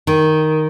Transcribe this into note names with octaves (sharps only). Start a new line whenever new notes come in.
D#3